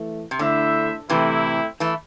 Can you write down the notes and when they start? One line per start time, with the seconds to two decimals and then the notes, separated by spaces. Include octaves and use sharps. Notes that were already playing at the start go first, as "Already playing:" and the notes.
Already playing: E3 A3
0.31 C3
0.39 D3 A3 E4 C5 E5
1.09 A2 C3 E3 A3 C4 E4
1.80 E3 A3